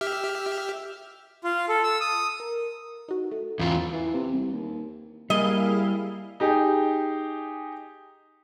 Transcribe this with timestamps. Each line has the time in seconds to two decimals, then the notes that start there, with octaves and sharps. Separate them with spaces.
0.01 G4 E5 F6
1.44 F4
1.69 A4
1.83 E6
2.01 D#6
2.40 A#4
3.08 D#4 F#4
3.32 A3
3.59 E2 F4 E5 A5
3.93 E3
4.14 C3
4.33 C2
4.52 D#2
5.30 G3 A#3 E4 G#4 D#5 F5
6.40 D#4 G4 G#4